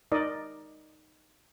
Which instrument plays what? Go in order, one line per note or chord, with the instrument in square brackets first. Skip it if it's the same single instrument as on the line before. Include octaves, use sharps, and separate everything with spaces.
[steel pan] D#4 A#4 D5 D#5